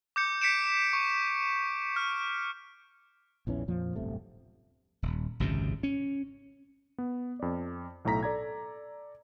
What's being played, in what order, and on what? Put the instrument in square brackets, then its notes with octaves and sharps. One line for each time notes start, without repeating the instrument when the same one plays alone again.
[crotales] D6 G6 C#7
B6 C#7 D7 E7
C#6
F6
[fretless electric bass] A#1 E2 E3 C#4
F2 A#2 F3
D1 G1 C3 A3
[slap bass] D#1
G#1 C#2 F#2 C3
C#4
[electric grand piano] B3
F2 D5
B1 A2 A4 A#5 B6
A4 D5 A#5 G#6